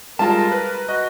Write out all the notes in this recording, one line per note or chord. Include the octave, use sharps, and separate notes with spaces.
G3 G#3 F4 A#4 A5
B4
F#4 D#5